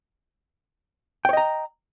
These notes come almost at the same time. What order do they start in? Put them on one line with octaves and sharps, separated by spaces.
G5 C#5 D#5 A#5